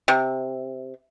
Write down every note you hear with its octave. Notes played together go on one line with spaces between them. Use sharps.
C3